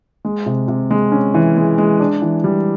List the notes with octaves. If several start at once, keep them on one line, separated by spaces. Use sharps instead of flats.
G#3
C3
C3
G#3
C#4
E3
G#3
G#3
D4
E3
G3